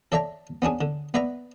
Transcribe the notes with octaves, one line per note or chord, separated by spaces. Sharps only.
A4 C#5 D5 E5 A5 A#5
B3 C#4 D4 G#4
D3
B3 B4 D5 E5 A#5